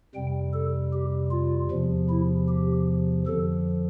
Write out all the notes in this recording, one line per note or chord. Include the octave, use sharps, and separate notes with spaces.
F2 C3 G3 G5
A4
G4
F4
E2 C3 F3
E4
G4
F2 D3 F3 A4